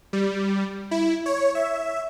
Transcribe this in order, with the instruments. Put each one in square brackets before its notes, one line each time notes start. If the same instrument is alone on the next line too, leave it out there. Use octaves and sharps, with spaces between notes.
[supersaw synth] G3
E4
C#5
E5